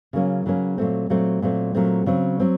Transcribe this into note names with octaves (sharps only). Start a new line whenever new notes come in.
C#3 F#3 A#3 C#4
C#3 F#3 A#3 C#4
A#2 F#3 A3 C4
A#2 F#3 A3 C4
A#2 F#3 A3 C4
A#2 F#3 A3 C4
C#3 F#3 C4
F#3 C4